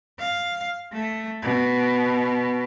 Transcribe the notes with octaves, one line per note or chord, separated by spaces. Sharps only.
F5
A3
B2